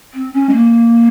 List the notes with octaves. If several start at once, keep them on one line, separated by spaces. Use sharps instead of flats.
C4
C#4
G#3
A#3